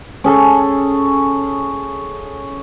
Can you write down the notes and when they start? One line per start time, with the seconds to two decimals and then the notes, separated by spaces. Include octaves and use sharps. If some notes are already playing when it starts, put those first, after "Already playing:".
0.24 C#4 G#4 A4